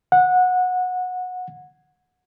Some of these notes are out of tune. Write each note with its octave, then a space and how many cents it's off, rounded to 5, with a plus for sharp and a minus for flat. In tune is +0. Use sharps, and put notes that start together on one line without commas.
F#5 -20